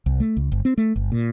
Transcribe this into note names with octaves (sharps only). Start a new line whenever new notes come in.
C2
A3
C#2
G1
C4
A3
G1
A#2